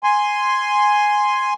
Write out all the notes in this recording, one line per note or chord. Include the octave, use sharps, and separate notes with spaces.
G#5 C6